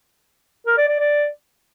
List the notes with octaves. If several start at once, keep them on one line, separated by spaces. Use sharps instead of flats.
A#4
D5
D5
D5